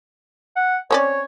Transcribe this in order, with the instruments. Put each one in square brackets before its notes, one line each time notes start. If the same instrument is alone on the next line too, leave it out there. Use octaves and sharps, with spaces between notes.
[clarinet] F#5
[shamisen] C4 C#4 D5 [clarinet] C#5